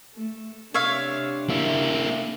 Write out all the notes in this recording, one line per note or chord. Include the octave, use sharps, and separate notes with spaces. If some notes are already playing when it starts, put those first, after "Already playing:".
A3
C3 D4 C#5 E5 F5
A#3 E4